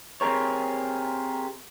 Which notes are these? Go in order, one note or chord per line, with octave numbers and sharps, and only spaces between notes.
C4 G4 G#4 A#4 C#5